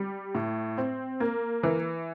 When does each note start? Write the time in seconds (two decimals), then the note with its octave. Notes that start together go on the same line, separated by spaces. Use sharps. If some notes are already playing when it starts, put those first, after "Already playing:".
Already playing: G3
0.35 A2
0.78 C4
1.20 A#3
1.63 E3